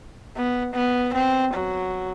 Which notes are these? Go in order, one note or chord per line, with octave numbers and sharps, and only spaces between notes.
B3
B3
C4
F#3